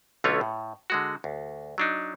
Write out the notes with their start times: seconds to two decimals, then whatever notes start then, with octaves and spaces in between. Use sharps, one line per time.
0.24 B1 D3 A3 C#4 F4 C#5
0.41 A2
0.90 D3 G#3 F#4
1.24 D2
1.78 F#3 D4 D#4